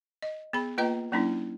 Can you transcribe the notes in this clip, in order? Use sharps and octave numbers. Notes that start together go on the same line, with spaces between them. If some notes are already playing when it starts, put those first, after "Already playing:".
D#5
B3 G#4 B5
A#3 F4 B4 D#5 G5 A#5
F#3 A#3 C#4 D4 E4